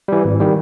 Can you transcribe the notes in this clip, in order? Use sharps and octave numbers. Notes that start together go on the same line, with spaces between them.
E3 G3
G#1
D#3 G3